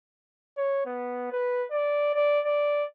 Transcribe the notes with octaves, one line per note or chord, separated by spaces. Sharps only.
C#5
B3
B4
D5
D5
D5